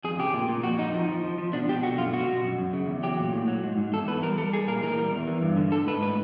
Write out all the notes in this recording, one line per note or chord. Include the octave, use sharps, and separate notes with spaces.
F2 G#4
C#3 G4
A#2
A#2
F2 F#4
F2 D#4
F3
F3
F3
F3
B2 D4
B2 G4
D3 F#4
F#2 F4
B2 F#4
B2
F#2
F#2
C#3
E2
F#3 G4
A#2
A2
F#3
G#2
G#2
E2 A4
E2 B4
G3 A#4
G3 A4
G3 G#4
A#2 A#4
E3 A#4
G3
E2
E3
G2
D3
G#2 A4
G#2 B4
A2 B4